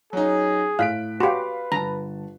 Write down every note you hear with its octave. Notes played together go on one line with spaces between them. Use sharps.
F#3 C#4 D#4 G#4
A2 F5 F#6 B6 D7
F#4 G4 B4 F5 B5 C6
G1 A5 A#5